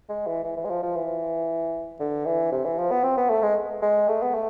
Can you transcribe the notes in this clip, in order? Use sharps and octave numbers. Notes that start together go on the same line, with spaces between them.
G#3
E3
E3
E3
G#3
F3
F3
E3
D3
E3
C3
E3
F3
B3
C4
B3
A3
G#3
G#3
A3
B3
A3